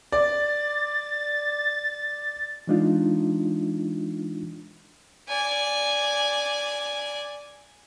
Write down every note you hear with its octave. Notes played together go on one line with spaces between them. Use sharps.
D5 A6
E3 G#3 D4 D#4 F4
D5 G#5